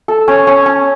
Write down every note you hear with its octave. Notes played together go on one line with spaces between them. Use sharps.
A4
C#4
C#4
C#4